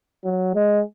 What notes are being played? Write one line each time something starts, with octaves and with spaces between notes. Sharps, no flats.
F#3
G#3